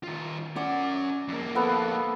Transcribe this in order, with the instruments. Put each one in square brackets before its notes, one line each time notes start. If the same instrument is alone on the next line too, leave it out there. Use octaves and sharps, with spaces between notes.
[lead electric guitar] D#3 F4
[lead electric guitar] C#4 F#5 [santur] D5
[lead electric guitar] F2 A#3
[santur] B3 A4 F5